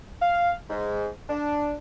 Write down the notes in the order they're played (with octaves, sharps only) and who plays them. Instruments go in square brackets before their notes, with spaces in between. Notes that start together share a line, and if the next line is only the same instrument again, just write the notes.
[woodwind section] F5
G#2
D4